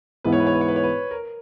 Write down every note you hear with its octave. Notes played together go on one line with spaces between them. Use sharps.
G#2 E3 B3 E4 B4
C#5
B4
C#5
B4
C#5
B4
C#5
B4
A#4